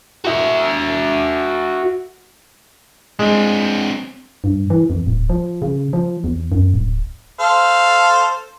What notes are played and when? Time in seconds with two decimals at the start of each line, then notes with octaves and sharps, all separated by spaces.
0.25 F#4 E5
3.19 G#3 C4 D4
4.44 G2
4.70 E3
4.90 F2
5.07 D1
5.30 F3
5.62 C#3
5.93 F3
6.24 E2
6.52 F#2
6.74 D1
7.40 A4 C5 F5